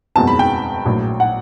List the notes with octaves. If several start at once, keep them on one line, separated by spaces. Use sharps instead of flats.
F#1 E2 B2 G#3 C4 A5
B5
G5
A#1 A2 F#3
F#5